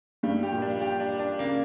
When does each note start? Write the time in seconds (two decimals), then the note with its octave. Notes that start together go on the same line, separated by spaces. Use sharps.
0.23 G2 G3
0.43 G4
0.52 A#2
0.62 D4
0.82 G4
1.00 D4
1.19 D4
1.39 C#3 A#3